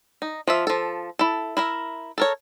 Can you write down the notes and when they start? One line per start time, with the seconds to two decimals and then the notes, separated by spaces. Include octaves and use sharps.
0.22 D#4
0.47 F3 F4 E5
0.67 F3 A4
1.19 E4 A4
1.57 E4 A#4 E5
2.18 A4 A#4 C#5